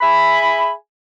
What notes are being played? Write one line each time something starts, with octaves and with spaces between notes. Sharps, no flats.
G#4 E5 G#5 B5